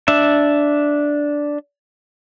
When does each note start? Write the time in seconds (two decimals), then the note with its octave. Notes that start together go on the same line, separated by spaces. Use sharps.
0.08 D4 E5